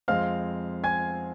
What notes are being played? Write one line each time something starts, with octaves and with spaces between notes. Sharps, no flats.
F2 F3 G#3 C4 F5 F6
G#5 G#6